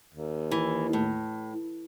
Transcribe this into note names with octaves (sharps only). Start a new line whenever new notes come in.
D#2
E3
A2